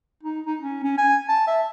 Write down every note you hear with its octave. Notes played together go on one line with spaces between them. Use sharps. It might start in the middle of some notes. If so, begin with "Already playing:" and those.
D#4
D#4
C#4
C#4
G#5
A5
E5